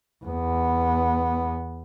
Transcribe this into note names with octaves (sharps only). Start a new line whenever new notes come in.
E2 B3